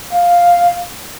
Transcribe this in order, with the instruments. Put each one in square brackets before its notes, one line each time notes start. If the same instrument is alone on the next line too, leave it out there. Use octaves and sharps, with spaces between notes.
[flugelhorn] F5